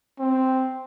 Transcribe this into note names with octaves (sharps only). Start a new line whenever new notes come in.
C4